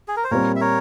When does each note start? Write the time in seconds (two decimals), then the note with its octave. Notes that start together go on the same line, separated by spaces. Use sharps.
0.08 G#4
0.17 A#4
0.24 C5
0.31 A#2 G3 C4 A#4 C#5
0.56 E5
0.61 A#4 C#5